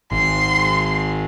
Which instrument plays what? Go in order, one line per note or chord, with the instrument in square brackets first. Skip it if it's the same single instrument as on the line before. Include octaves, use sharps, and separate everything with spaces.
[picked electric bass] G#1 [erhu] C6